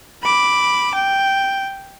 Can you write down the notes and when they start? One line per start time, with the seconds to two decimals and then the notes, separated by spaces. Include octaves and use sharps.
0.23 B5 D6
0.94 G5